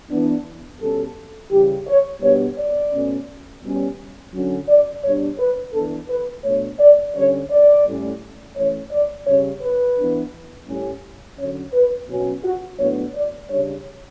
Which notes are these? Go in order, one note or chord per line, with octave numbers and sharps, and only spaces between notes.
E3 B3 D4
B2 G3 C#4 A4
C#3 E3 G3 G4
C#5
B2 G3 B3 D4 C#5
D5
B2 A3 C#4
B2 G3 C#4
D3 F#3 C#4
D5
B2 G3 D4 C#5
B4
E3 B3 D4 A4
B4
B2 A3 D4 C#5
D5
D3 G3 C#4 C#5
D5
A2 G3 C#4
E3 A3 C#4 C#5
D5
C#3 G3 C#4 C#5
B4
E3 B3 D4
A2 G3 C#4
D3 F#3 C#4 C#5
B4
B2 F#3 C#4
F#4
A2 F#3 B3 D4 C#5
D5
C#3 G3 D4 C#5